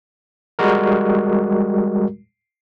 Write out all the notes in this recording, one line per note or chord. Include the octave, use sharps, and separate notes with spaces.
G3 G#3 F#4 A#4